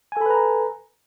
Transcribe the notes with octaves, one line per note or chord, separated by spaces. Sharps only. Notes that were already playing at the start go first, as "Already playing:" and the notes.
A4 B4 G#5 A#5 B5